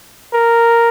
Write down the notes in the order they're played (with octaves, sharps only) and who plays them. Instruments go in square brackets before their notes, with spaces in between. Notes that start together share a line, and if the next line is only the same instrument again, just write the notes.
[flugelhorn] A#4